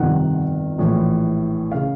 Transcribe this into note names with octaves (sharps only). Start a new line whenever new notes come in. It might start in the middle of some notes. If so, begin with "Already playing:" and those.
Already playing: G1 F2 C3 D#3 F#5
A#1 A2 E3
C#3 F5